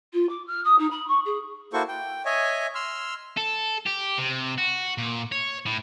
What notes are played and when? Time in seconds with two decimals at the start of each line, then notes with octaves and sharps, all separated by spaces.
0.13 F4
0.29 D6
0.47 F6
0.65 D#6
0.79 D#4
0.91 B5
1.08 C#6
1.25 G#4
1.73 A#3 E4 F#4 A4 C5 C#6
1.88 G5
2.25 C#5 D#5 E5 G#5
2.75 C6 E6 F6
3.37 A4
3.87 G4
4.18 C3
4.58 F#4
4.98 A#2
5.32 C#5
5.66 A2